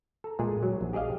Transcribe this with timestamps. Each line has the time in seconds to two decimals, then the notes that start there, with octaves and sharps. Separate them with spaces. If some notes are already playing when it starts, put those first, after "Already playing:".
0.24 A4 A#5
0.39 A#2 G#3 G#4
0.63 F#3
0.81 A#1
0.93 G4 G#4 D5 D#5 F5